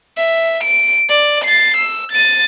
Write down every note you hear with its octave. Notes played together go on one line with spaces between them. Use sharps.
E5
D7
D5
A6 C7
E6
A6 D#7